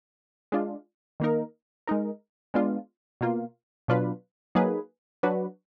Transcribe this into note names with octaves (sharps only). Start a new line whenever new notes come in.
G#3 D4 F4
D#3 A#3 D#4 A#4
G#3 D#4 A#4
G#3 B3 D4 F4
B2 A#3 F4
B2 F#3 D4 F4 B4
F#3 A#3 D#4 G#4 B4
F#3 D4 F#4 B4